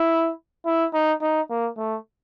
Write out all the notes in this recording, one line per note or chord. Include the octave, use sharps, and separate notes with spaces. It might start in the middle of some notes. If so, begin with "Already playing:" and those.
Already playing: E4
E4
D#4
D#4
A#3
A3